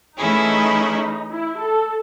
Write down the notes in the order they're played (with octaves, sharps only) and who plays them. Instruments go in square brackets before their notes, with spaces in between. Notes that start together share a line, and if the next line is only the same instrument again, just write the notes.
[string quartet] E3 A3 C#4 E4 G#4 [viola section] D#4
[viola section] E4
A4